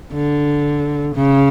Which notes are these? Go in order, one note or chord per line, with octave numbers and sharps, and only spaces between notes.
D3
C#3